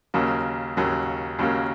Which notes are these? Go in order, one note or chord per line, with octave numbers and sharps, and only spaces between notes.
D#2 C#3 F#3 A#3
D#2 C#3 F#3 A#3
D#2 C#3 F#3 A#3